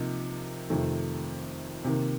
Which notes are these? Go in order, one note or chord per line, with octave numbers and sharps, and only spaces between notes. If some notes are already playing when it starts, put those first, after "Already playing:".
Already playing: C3 F3 A#3 D#4
F2 C3 D#3 A3
C3 D#3 A#3